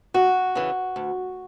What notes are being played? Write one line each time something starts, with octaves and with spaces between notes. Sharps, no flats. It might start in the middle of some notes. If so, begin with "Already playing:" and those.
D2 F#4
C#3 E3
D2